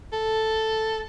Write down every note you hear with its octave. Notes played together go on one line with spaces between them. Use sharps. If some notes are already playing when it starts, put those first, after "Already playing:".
A4